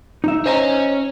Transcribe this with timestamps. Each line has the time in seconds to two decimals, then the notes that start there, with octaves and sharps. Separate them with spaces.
0.24 D#4 E5
0.46 C#4 C5 D#5 A#5